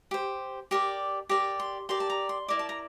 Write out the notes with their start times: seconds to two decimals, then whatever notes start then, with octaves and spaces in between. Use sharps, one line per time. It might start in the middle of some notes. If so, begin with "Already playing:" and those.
0.11 G4 C5
0.71 G4 A#4 D5
1.29 G4 A#4 D5 D6
1.60 C6
1.89 G4 A#4 D5 C6
2.00 A5
2.10 A#5
2.29 C6
2.48 E4 A#4 D5 D6
2.59 A5
2.69 A#5